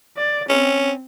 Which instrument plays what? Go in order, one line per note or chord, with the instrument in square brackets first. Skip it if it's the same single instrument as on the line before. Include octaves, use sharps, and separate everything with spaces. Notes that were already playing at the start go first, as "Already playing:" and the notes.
[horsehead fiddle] D5
[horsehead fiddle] C4 [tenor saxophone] C#4